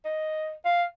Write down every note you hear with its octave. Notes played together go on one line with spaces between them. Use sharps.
D#5
F5